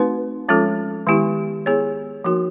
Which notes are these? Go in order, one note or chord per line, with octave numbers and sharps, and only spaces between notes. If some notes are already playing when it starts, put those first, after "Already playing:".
Already playing: A3 C4 D#4 F#4 B4
F3 G#3 C#4 F4 A4
D#3 G#3 B3 E4 G4
B3 E4 G#4 C#5
F3 A#3 D#4 F#4 A#4